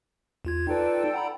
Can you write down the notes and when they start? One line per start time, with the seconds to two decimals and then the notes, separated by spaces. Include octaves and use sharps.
0.45 E2 F4 G#6
0.67 D#4 F4 A4 B4 D5 G5
1.14 F#5 A#5 B5